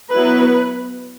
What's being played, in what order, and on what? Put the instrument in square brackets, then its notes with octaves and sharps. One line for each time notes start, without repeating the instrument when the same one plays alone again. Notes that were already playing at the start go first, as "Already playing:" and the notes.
[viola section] F#3 B3 E4 B4